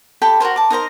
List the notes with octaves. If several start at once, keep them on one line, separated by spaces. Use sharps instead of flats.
G4 A4 G5 B5
F#4 A4 A#4 C5
A5 D6
D#4 A#4 C5 A#5